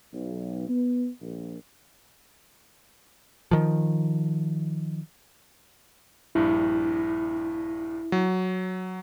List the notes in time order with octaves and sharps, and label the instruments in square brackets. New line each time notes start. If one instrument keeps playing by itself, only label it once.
[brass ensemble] B1
B3
A#1
[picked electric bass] D#3 F3
[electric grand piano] A#1 G2 [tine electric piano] E4
[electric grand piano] F#3